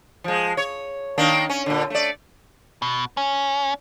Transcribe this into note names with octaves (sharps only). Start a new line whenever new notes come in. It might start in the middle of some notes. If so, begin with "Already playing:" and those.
F3 G#3
C#5
D#3 A#3 D4
C#4
A#2 D3
A3 D5
B2
C#4